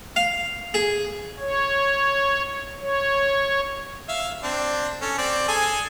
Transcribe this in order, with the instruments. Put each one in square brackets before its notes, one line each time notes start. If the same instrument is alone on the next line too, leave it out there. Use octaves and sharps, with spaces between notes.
[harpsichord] F5
G#4
[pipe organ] C#5
C#5
[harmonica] E5 F5
C4 D4
C#4 A4
C4 D5
G#4 A4 G#5